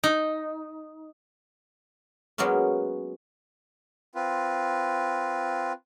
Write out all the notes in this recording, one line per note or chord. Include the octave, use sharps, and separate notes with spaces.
D#4
F#3 G#3 A#3 B3 C#4
C4 F4 B4